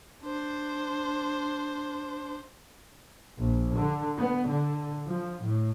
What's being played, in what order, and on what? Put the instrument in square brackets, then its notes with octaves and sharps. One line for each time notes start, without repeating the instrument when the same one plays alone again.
[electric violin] D4 C5
[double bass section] A#1
D3
B3
D3
F3
A2